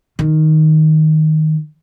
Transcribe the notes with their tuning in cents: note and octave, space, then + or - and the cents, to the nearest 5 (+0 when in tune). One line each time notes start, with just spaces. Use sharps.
D#3 +5